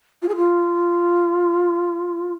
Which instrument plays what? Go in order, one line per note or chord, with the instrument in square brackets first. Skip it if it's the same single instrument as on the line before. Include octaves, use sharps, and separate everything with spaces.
[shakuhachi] F4
G#4
F4